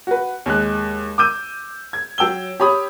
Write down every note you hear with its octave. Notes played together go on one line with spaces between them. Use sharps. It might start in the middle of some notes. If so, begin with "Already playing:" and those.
F#4 B4
D#2 G#3 F#6
D6 E6 G6 D#7
G#6
F#3 G5 E6 G7
G4 C#5 B5 D#6